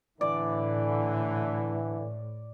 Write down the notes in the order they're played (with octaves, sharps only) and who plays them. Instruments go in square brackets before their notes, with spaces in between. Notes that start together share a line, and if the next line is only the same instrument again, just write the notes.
[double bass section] A2 [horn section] D3 E3 [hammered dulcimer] D5